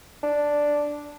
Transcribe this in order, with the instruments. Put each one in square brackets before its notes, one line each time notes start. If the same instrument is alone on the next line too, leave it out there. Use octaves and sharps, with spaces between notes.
[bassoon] D4